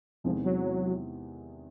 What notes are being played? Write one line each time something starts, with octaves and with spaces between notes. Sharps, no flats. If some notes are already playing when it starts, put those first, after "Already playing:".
E2 C3 D#3 F3 G#3 C4
F#3